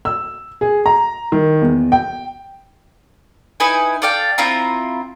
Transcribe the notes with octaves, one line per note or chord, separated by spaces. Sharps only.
E6
G#4
A#5
D#3
E2
G5
D#4 E4 B4 G#5
A4 D5 F5 G5
C4 E4 F4 A#5